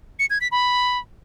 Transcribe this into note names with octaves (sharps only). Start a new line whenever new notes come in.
C#7
G#6
B6
B5